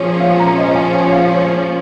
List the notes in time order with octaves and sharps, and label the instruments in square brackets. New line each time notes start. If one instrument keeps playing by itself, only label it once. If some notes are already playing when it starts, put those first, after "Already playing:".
Already playing: [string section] A#2 F3 C#4 G#4 [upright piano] C#5
[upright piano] F5
A#5
D#5
G#5
G#5
F5
C#5